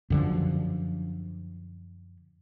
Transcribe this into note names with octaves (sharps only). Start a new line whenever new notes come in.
F#2 D3 F3